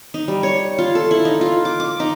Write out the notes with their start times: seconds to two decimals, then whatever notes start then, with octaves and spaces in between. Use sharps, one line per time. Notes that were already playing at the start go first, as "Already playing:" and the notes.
0.14 D#4
0.28 G3
0.43 C#5
0.78 F4
0.95 A4
1.11 E4
1.25 D#4
1.41 F4
1.65 D6
1.80 D6
2.00 D#4